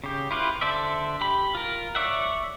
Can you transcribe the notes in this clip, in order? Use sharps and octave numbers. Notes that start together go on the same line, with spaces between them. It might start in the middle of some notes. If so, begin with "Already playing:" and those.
C#3 G4
E4 F4 G4 B4
D3 A4 C5 D5 E5
G4 B5
F4 A#4
C#5 D5 E5 F#5